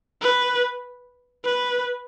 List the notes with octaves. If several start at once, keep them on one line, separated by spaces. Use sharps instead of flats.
B4
B4